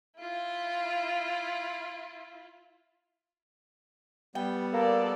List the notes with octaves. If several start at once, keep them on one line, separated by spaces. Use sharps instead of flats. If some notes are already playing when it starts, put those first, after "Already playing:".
E4 F4
G3 B3 G5
A#3 A4 D5